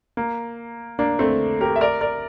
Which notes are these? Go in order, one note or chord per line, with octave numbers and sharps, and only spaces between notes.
A#3
A#3 D4
A3 C4
G4 A#4
E5
A#4 D5
A#4 D5